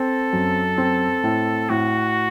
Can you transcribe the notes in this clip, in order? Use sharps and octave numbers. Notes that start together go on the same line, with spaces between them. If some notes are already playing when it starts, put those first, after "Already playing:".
Already playing: C4 A4
F#2
C4
A2
A2 F#4